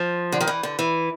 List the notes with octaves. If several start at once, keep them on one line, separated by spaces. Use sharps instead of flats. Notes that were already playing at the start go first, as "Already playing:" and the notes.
Already playing: F3
D3
D#3
E3
D3
E3